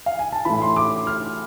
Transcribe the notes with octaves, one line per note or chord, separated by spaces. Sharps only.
F5
G#5
A5
A2 E3 B5
C6
D6
F6